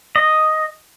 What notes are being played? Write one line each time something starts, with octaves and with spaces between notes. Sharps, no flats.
D#5